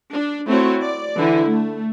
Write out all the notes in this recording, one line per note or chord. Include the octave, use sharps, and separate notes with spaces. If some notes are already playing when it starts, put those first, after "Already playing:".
D4
A3 C4 E4 F#4 C#5
D5
D3 E3 E4
A3